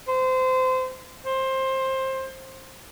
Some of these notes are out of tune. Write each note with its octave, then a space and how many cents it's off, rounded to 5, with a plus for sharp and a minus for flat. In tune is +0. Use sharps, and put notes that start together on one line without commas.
C5 -25
C5 +20